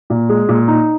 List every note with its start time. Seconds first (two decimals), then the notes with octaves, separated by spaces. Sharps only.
0.10 A#2
0.29 G#3
0.49 A#2
0.68 D#4